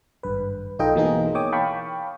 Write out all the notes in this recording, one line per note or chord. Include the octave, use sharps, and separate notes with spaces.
G#1 G2 B4
B1 D#4 F4 A4 D#5 G5
B2 E3 A#3 D#4 G#4
C#5 G5 D6 D#6
F5 G5 A5 B5 C#6